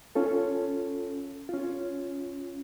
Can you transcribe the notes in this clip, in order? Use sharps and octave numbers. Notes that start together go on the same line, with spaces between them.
C#4 F4 A4
C#4 F4